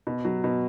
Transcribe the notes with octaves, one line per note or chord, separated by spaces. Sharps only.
B2
F#3
B2